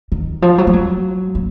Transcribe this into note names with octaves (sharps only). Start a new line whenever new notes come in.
D#3
F3
F#3
G#3
F#3
A#3